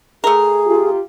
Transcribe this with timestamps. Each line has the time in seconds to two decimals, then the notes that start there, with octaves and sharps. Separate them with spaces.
0.24 A3 G#4 A#4
0.65 F4 G4